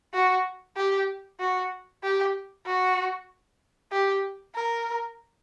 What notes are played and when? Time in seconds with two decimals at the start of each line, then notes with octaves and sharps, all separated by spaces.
0.14 F#4
0.76 G4
1.40 F#4
2.03 G4
2.66 F#4
3.92 G4
4.55 A#4